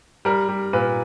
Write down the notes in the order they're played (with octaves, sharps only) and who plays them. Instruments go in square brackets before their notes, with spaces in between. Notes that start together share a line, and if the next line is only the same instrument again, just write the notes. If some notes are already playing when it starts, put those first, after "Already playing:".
[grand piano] G3 A#4
G3
A#2 B4